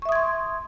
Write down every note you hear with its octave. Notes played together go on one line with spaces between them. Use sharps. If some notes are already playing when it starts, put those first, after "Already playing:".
E5 C6 C#6 D#6 G#6